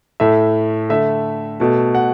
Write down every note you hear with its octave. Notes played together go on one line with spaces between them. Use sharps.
A2 A3 E5
D3 A3 E5
B2 A3
F#5